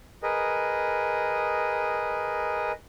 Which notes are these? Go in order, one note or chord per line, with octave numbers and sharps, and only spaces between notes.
G#4 A#4 B4 D#5